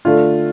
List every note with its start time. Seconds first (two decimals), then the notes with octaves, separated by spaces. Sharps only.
0.05 D3 A3 F4